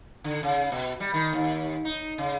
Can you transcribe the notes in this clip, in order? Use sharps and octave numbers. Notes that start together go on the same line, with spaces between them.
D3
C#3
B2
G3
D#3
D#2
D#4
C#3